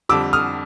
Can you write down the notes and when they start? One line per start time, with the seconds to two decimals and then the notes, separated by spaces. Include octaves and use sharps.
0.09 F2 D3 G3 D6 E6
0.33 D#6 F6